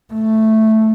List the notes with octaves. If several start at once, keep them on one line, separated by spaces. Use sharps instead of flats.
A3